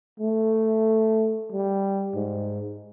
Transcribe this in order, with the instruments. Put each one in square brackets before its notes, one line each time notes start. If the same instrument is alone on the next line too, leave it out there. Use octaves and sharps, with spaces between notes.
[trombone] A3
G3
G#2